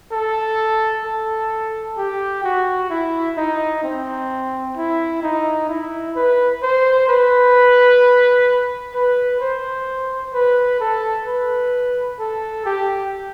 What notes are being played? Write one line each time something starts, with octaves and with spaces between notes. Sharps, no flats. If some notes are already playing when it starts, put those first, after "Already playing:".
A4
A4
G4
F#4
E4
D#4
C4
E4
D#4
E4
B4
C5
B4
B4
C5
B4
A4
B4
A4
G4